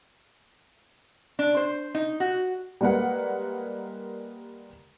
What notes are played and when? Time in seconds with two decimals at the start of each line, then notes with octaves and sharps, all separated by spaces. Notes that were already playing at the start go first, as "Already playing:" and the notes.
1.39 D4
1.57 C5
1.95 D#4
2.20 F#4
2.81 G3 G#3 A#3 B4 F#5